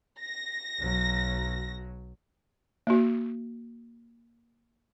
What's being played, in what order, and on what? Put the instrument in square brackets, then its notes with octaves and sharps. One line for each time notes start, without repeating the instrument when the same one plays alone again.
[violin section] A#6
[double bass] B1 F#3
[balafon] A#3 F#4